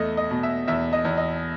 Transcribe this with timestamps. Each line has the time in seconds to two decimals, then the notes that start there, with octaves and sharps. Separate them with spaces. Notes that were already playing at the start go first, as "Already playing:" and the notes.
Already playing: E2 A3 D#5
0.17 D#5
0.31 B2
0.43 E5
0.68 E2 E5
0.93 D#5
1.05 E2
1.18 D#5